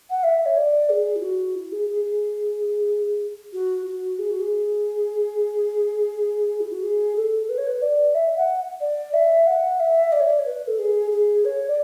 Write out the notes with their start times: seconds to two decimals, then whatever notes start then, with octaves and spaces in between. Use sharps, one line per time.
0.10 F#5
0.23 E5
0.46 C#5
0.57 D5
0.90 G#4
1.16 E4
1.22 F#4
1.55 E4
1.72 G#4
1.89 G#4
2.05 G#4
3.53 F#4
3.86 F#4
4.19 G#4
4.30 F#4
4.41 G#4
6.61 E4
6.72 F#4
6.83 G#4
7.16 A4
7.49 B4
7.58 C#5
7.67 B4
7.82 D5
8.15 E5
8.37 F#5
8.81 D5
9.13 E5
9.47 F#5
9.80 E5
10.12 D5
10.20 C#5
10.27 D5
10.39 C#5
10.46 B4
10.67 A4
10.79 G#4
11.11 G#4
11.45 C#5
11.68 D5